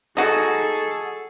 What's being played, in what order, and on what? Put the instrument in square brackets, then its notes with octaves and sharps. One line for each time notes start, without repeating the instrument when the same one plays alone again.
[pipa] D#4 F#4 [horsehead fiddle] G#4 A4